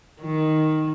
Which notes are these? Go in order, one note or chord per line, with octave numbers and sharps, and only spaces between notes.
D#3